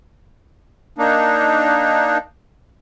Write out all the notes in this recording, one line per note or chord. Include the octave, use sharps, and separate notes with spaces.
A#3 D4 D#4